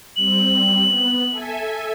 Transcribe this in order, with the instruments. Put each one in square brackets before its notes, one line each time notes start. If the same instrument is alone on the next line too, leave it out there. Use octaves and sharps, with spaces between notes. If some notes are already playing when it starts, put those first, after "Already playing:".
[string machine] G3 C4 [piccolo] F#7
[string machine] B3
A4 E5 G#5